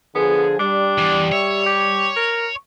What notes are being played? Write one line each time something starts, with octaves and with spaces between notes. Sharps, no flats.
D3 F3 B3 G#4
G3 D4
E2
C#5 E5
G4
A#4